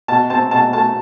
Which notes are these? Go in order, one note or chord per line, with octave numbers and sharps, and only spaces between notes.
B2 A5
C4 A5
B2 A5
A3 A5